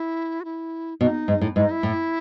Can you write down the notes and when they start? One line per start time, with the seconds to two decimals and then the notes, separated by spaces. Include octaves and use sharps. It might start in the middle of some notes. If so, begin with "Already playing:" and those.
Already playing: E4
0.40 F#4
0.45 E4
1.00 B2 D#4
1.28 G#2
1.41 A2
1.55 G#2 E4
1.63 D#4
1.71 E4
1.83 A2